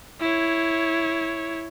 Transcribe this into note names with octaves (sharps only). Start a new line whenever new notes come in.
E4 C#5